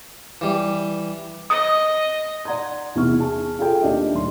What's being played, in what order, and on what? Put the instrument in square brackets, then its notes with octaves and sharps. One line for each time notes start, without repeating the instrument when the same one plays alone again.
[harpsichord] E3 G3
[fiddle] D#5 [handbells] D#6
[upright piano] D5 F#5 A#5 C6 G#6
E2 C3 B3 E4 C#6 F6
G#4 A5
F4 G#4 A4 G5
D#2 D4 G4 D#5 E5
D#1 C6